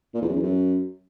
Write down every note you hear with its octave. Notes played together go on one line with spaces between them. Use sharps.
A#2
E2
F#2
E2
F#2